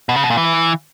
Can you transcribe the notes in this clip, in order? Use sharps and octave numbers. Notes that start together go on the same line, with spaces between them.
B2
C#3
B2
A#2
E3